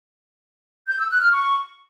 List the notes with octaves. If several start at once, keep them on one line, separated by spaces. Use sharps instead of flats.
G6
E6
F#6
F6
C#6